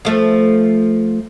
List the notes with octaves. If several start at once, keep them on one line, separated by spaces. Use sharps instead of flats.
F3 A3